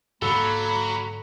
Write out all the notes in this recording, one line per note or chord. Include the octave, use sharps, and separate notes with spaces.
G#2 D3 F#3 A#3 A4 B5